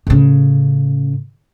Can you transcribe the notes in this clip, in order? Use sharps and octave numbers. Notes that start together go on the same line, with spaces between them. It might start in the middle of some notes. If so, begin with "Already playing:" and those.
A2 C#3